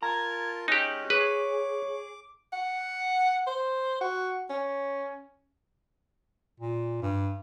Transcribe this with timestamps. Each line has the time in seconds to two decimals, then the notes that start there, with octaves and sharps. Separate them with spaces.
0.03 F4 A#4 A5 A#5 G#6
0.68 G#3 C#4 D#4 G4 F#6
1.10 G#4 B4 C#5 D6
2.53 F#5
3.47 C5
4.01 F#4
4.50 C#4
6.60 A#2
7.02 G2